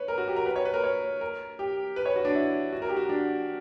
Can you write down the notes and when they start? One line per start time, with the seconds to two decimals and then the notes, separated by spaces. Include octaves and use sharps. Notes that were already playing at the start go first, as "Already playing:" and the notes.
Already playing: B4 C#5
0.08 A#4
0.18 F#4
0.27 G4
0.36 A#4
0.46 B4
0.56 C#5
0.65 B4
0.74 A#4
0.84 C#5
1.21 A#4
1.59 G4
1.96 B4
2.06 C#5
2.16 F#4
2.25 D4
2.35 E4
2.73 F#4
2.82 A#4
2.89 G4
2.97 F#4
3.09 D4